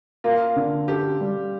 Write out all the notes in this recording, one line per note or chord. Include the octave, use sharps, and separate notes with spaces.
A#3 F4
D3
G4 A4
G3